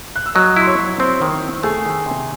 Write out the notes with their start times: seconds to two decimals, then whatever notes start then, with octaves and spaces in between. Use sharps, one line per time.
0.16 F#6
0.26 E6
0.35 F#3 D#5 D#6
0.56 E4 C6
0.67 C#5 C#6
0.79 F#3
0.99 C4 C5 C6
1.22 D#3
1.43 E4
1.63 A3 G#4 G#5
1.85 D#3
2.06 C3